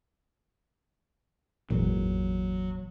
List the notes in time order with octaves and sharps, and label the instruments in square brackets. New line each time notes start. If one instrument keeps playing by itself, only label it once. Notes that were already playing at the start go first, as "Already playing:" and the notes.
[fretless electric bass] G#1 E2 A#2 [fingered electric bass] F#3